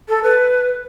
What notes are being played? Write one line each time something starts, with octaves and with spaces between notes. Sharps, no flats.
A4
B4